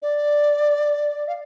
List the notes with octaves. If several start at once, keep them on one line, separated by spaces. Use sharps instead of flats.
D5
F5